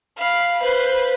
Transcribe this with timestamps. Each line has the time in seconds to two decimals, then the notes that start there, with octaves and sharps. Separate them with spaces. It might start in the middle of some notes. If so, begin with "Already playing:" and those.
0.18 F5 B5
0.62 B4 C5